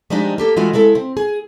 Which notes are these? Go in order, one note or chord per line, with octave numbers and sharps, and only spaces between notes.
F3 G3 G#3 D4 D#4 G4
A#3 G4 A4
E3 G#3 A3 F4 F#4
C#3 G#3 E4 A4
C4
G#4